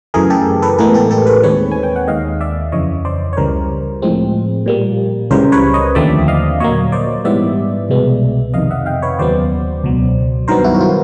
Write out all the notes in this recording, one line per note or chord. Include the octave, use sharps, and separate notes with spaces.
F#2 C#3 E3 A3 G#4 A#4
G4 A4
A4 B4
A2 E3 G#3 B3 G#4 A#4
G4 A4
G4 A4
A4 B4
D#2 D#3 G#3 C4 B4 C#5
G#5
G5
F#5
D#2 D#3 G#3 D#5 F5
D5 E5
F2 C#3 E3 C#5 D#5
C5 D5
C#5
C#2 C#3 E3 G3 A#4 C5
A2 F3 G#3 C4
A#2 G3 A#3
C#2 C#3 E3 G3 A#4 C5
B4 C#5
C#5 D#5
D#2 D3 F3 A3 C4 D5 E5
D#5 F5
A#2 F#3 A#3 C#5 D#5
C5 D5
G#2 E3 G3 B3 D5 E5
C2 B2 G#3 B3
F2 C3 D#3 D#5 F5
E5 F#5
F5 G5
B4 C#5
D#2 C#3 F#3 B3 C5 D5
C#2 B2 F#3
G2 D#3 F#3 B3 A#4 C5
E4 F#4
F#4
F4